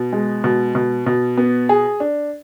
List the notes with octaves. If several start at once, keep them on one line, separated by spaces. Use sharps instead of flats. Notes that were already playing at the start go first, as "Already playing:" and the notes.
Already playing: B2
G#3
B2
B2
B2
B3
G#4
D4